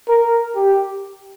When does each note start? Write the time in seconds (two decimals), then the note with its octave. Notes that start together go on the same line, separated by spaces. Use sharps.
0.08 A#4
0.56 G4